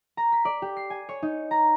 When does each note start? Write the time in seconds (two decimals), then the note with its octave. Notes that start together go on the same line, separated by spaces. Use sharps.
0.17 A#5
0.32 B6
0.45 D5
0.62 G4
0.77 C7
0.90 G#5
1.09 C#5
1.23 D#4
1.51 A#5